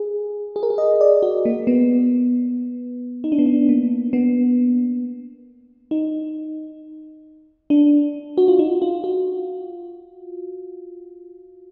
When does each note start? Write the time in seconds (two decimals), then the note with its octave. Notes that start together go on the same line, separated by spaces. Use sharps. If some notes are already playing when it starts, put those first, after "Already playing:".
Already playing: G#4
0.56 G#4
0.63 A#4
0.70 G#4
0.78 D#5
1.01 D5
1.23 F#4
1.45 A#3
1.67 B3
3.24 D#4
3.32 D4
3.38 B3
3.46 D4
3.69 A#3
4.13 B3
5.91 D#4
7.70 D4
8.38 F#4
8.48 F4
8.59 D#4
8.82 F4
9.04 F#4